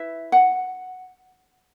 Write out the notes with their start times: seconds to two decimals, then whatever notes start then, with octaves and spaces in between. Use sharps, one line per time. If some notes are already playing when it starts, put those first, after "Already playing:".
Already playing: E4 B4 E5
0.32 F#5